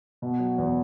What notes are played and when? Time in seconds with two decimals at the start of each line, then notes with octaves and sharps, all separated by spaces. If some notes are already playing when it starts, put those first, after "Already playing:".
0.22 B2
0.40 F#3
0.58 E2